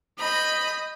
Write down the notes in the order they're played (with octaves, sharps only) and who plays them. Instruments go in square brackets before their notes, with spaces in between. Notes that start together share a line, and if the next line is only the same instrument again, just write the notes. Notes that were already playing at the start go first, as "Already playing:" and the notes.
[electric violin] D#5 G6 [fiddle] B5